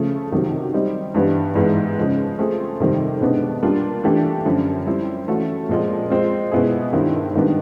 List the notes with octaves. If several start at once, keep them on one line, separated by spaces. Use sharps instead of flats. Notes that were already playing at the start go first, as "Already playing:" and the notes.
Already playing: C#3 F3 A3
C3 D#3 F#3
G3 C4 D#4
G2 E3 G3 B3
G#2 E3 G#3 B3
C#3 F3 G#3
A3 C4 F4 G#4
F2 C3 D#3 G3 C4
B2 G#3 B3 D4
G3 A#3 D4 F4
E3 A3 D4 G4
F#2 D3 F3
G3 C4 E4
E3 A3 C#4 F#4
A#2 F3 G#3 C4 F4
G#3 C4 F4
B2 G#3 B3 E4 G#4
G2 D#3 G3 C4 E4
G#2 D#3 G3 B3 D4